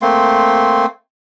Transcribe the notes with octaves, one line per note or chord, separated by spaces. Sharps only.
A3 A#3 C4 C6